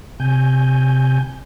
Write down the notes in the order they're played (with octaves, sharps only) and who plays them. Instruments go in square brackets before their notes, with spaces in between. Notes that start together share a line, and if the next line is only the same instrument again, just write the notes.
[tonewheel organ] C3 G#5 G6